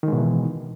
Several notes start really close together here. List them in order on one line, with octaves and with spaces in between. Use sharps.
D#3 G#3 B2 E3